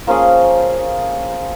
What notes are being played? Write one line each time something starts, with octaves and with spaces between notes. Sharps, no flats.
F3 A#3 C#4 G#4